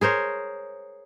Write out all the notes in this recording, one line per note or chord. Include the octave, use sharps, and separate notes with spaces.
G#4 A#4 C5 C#5